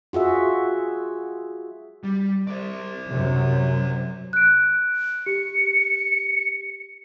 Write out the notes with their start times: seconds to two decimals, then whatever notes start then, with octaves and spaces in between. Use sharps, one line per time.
0.13 F4 F#4 G#4 E5
2.04 G3
2.48 C5 D5
3.09 F#2 C3
4.33 F#6 D7
5.26 G4 C#7